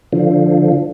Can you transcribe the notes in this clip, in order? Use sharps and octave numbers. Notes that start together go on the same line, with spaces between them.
D3 F3